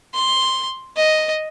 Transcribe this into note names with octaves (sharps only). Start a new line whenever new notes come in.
C6
D#5